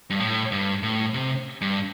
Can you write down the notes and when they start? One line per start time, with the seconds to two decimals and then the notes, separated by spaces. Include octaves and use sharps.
0.10 G2
0.20 A2
0.52 G2
0.83 A2
1.14 C3
1.61 G2